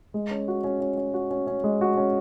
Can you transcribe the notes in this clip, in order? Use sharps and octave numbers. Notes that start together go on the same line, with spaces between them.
G#3
C#4
F#4
C#4
C#4
C#4
F#4
C#4
C#4
G#3
F#4
C#4